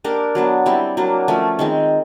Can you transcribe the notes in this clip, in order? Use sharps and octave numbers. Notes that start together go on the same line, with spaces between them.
A#3 D4 G4 A#4
F#3 B3 D4
G3 C4 E4
F#3 A#3 D4
F3 A3 C#4
D#3 G#3 C4